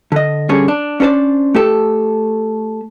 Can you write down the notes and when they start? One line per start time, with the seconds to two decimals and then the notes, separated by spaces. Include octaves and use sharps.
0.12 D3 D#5
0.49 G2 D3 C#4 G#4 C#5
0.68 D4
1.00 C#4 D4 A#4 C5 D5
1.54 A3 G4 A4